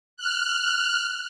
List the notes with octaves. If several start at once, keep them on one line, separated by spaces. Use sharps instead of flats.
F6 F#6